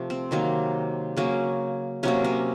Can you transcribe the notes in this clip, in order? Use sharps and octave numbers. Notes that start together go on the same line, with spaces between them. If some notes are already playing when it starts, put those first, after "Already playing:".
Already playing: C3 F3 A3
C4
C3 D#3 F#3 A#3
C#3 F#3 A#3 C#4
C3 F#3 A#3 C#4
C#4